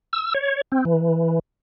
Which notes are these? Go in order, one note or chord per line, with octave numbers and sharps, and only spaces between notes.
E6
C#5
C4
E3